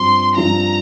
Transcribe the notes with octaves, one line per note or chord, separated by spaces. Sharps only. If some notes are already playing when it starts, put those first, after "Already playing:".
Already playing: G2 F3 C4 C6
G2 F3 C4 A#5